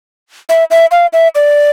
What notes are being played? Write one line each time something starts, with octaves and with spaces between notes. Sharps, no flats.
E5
E5
F5
E5
D5